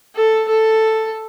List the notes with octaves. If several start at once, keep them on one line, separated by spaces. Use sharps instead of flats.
A4
A4